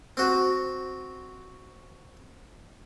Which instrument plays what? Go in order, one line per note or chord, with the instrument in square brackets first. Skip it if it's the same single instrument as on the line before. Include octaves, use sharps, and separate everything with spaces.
[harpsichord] C4 F#4